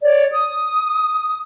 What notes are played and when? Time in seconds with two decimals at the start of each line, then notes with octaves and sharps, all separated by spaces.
0.02 C#5 D5
0.33 D#6